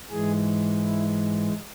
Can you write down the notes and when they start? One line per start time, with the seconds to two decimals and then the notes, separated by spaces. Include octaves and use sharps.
0.10 G#2 E3 G#3 G#4
0.83 E4